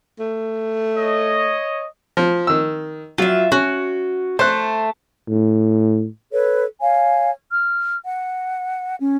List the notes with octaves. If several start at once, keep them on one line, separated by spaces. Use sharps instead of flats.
A3
C#5 D#5
F3
D#3 E6
F#3 F4 E5
C#4 F#4
A3 C5 F#6
A2
A4 B4 C#5
C#5 F5 G#5
F6
F#5
C#4